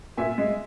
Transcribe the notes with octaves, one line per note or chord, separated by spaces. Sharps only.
A#2 E5 G#5
G#3